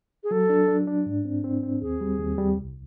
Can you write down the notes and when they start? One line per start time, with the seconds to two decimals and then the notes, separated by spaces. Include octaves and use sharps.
0.23 G#4
0.31 F#3 A4
0.50 D4
0.68 D4
0.87 D4
1.06 G#2
1.25 C4
1.44 C4
1.63 C4
1.81 D#2 G#4
2.01 G3
2.19 D#2
2.38 G3
2.57 C2